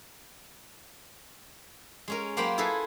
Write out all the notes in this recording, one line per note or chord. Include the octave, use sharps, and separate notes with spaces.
G#3 C#4 A#4
F#3 A#3 C5 G5 A#5 B5
E4 F4 G#4 A4 B4